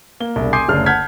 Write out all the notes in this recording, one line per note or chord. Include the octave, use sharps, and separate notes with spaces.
A#3 G7
E1 C2
G#5 C6 D6 D#6 G6 C7
F#1 D2 C#4 D4 G#4 F6
F#5 A5 F6 G6 G#6 B6